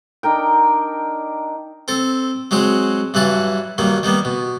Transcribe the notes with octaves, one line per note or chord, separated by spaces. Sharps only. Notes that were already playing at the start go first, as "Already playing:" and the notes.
D4 D#4 A#4 G5
C4 A4
F#3 G#3 C4 F#4
G2 E3 F#3 F#4 A5
G2 D#3 F#3 A#3
D#3 G3 A#3 B3
B2